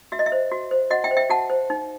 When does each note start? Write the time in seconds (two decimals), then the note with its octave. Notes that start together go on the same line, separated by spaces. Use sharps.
0.12 F#4 E5
0.19 D#5
0.26 E5
0.32 C5
0.52 F#4
0.71 C5
0.91 F#4 D#5 F#5
1.04 E5 G5
1.11 C5
1.17 E5 G5
1.30 F#4 F#5 A5
1.50 C5
1.70 D#4